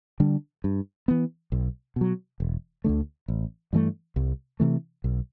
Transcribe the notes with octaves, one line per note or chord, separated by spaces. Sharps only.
D3 G3 D4
G2
E3 B3
B1
B2 F#3
E1
D2 D3 A3
A1
G2 E3 A3
C2
C3 E3 A3
B1